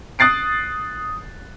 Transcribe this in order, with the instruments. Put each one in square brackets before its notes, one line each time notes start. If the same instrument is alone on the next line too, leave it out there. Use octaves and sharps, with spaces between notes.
[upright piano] D#6 F#6 A6 C7 D7